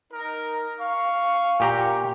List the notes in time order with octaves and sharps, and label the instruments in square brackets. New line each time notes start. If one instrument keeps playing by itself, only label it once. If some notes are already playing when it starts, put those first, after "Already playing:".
[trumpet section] D#4 A#4
F5 C#6
[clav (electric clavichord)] A#2 G4 A#5